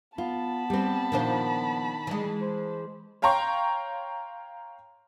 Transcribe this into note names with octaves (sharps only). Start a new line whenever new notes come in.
B3 F4 A5 B5
G3 C4
A#2 D#3 F3 D4 C5
E3 G3 G#3
C5
C#5 F5 G5 A#5 C6 C#6